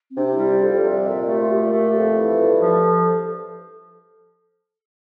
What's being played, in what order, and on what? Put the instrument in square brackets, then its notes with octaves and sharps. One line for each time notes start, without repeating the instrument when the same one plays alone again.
[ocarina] C4
[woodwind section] C3 [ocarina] D4
[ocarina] E4
[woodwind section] G3
[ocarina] F4
[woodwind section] F2 [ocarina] A4
[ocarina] D5
[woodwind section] C3
[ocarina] D5
[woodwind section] A#2 [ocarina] E5
[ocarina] D5
[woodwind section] A3 [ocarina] G4
[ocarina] F4
[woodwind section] A#2 [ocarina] G4
[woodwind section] A3
[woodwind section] F2 [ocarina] A4
[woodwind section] E3
G2
F3